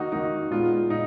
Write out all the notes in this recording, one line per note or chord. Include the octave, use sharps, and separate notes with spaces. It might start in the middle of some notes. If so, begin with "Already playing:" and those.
Already playing: D#3 A#3 D#4 F#4
D#3 A#3 D#4
A#2 G#3 B3 F4
A#2 D#4